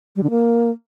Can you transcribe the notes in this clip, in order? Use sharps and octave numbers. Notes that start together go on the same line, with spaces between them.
G3
D3
A#3